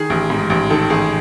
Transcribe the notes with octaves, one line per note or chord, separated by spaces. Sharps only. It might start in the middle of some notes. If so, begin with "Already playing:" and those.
Already playing: D#3 G#4
A1
G#2
A1
D#3 A4
A1 G#4